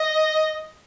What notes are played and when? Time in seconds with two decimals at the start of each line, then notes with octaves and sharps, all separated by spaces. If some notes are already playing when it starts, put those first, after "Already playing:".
Already playing: D#5